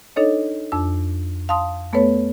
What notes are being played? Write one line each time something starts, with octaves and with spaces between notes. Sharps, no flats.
D4 D#4 A4 C#5 D#5
F2 D4 E6
F5 A5 C6 D#6
A3 B3 A4 B4 C#5